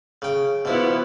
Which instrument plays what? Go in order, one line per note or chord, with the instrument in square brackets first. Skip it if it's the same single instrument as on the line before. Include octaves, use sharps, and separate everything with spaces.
[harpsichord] C#3 G5
[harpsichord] B2 F3 [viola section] B3 E4